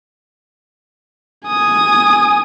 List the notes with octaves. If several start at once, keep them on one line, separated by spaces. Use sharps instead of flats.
G#5 D#6